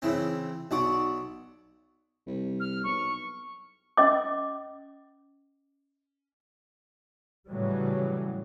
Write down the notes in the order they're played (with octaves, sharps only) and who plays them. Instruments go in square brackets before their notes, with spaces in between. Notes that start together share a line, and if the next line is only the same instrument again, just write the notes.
[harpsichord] C#3 E3 C4
[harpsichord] B1 D5 F#5 [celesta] D#4 F#4 C#6
[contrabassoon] C2
[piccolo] F6
[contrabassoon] B1 [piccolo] C#6
[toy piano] C#4 D#5 D6
[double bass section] A2 C#3 E3 F#3 G3